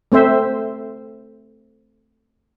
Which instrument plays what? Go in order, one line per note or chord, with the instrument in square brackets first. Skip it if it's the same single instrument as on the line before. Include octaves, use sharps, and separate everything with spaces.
[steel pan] A3 C4 C5 E5